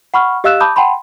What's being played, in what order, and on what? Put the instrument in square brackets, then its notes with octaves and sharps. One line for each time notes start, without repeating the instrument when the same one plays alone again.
[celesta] F#5 B5 C#6 F6
G4 D#5 F5 E6 F#6 E7
A5 B5 D6 D#6 G6
F#5 G5 A5 B5 C6